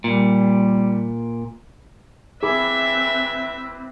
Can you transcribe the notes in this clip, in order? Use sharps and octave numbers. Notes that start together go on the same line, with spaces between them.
A#2 G3
C4 E4 G#4 B4 E5 B5 D6